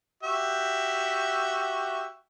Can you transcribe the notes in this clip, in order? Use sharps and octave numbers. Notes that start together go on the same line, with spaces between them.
F#4 G4 E5